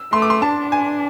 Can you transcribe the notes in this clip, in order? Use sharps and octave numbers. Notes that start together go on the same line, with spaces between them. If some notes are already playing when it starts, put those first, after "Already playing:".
Already playing: E6
A3 C6
D6
C6
D4 A5
G#5